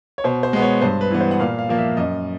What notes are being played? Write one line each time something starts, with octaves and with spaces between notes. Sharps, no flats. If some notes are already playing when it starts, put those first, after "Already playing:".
C#5
B2 C5
C5
G#3 B3
C#5
G2 C5
B4
E3 G3 B3
C5
F#5
A#2 F5
F5
F3 A#3
E5
F#2 D#5